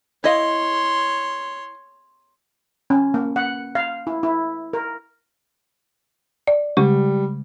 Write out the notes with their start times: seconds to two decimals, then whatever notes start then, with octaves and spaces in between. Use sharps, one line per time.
0.24 E4 C#5 D#5 F5 C6
2.90 C#4
3.14 A#3
3.36 F#5
3.75 F5
4.07 E4
4.23 E4
4.73 A#4
6.47 D5
6.77 C#3 G3 G#3